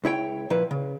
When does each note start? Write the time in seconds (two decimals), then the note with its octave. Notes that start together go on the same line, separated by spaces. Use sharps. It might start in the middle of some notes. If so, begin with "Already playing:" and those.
0.04 C#2 E4 C#5 G5
0.50 A#2 F3 E4 B4
0.71 C#3